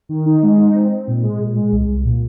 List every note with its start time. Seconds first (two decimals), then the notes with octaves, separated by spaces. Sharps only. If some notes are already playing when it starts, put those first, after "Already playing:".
0.09 D#3
0.26 D#4
0.43 G#3
0.58 D#4
0.74 C4
0.91 C4
1.07 A#2
1.22 G#3
1.39 A#2
1.56 G#3
1.72 C2
1.88 C2
2.04 A#2